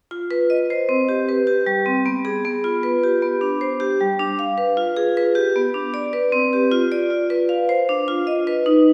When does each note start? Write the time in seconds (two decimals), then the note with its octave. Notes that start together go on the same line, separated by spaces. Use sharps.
0.11 F4
0.31 B4
0.50 D#5
0.70 C5
0.89 C4
1.09 G4
1.29 B4
1.47 G4
1.66 G3
1.86 C4
2.06 B3
2.25 G#4
2.45 B3
2.64 F4
2.83 B4
3.04 G4
3.22 B3
3.41 D4
3.61 C5
3.80 G4
4.01 G3
4.19 D4
4.39 F5
4.58 B4
4.77 F4
4.96 G#4
5.17 B4
5.35 G4
5.56 B3
5.74 D4
5.94 D5
6.13 B4
6.32 C4
6.53 G4
6.72 F4
6.92 D5
7.10 F4
7.30 B4
7.49 F5
7.69 C5
7.89 D4
8.08 F4
8.27 D#5
8.47 B4
8.66 D#4